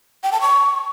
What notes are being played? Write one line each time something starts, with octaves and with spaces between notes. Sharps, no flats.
G5
A5
C#6